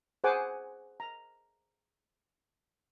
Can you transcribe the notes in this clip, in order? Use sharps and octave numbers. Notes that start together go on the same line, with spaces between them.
G#4 C5 F#5 G#5 D6
A#5